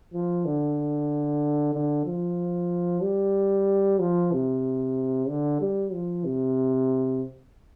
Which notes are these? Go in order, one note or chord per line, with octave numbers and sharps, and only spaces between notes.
F3
D3
D3
F3
G3
F3
C3
D3
G3
F3
C3